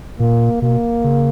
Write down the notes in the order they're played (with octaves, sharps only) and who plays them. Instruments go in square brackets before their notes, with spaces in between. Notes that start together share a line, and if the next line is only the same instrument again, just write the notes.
[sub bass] A#2 [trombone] A#3
[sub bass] B2 [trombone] A#3
[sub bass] C#3